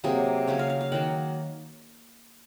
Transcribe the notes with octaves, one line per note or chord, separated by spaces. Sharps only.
C3 F#3 A#3 G#4
C#3 F#3 A#3 C#5
F5
F5
F5
D#3 F#3 A#3 F#5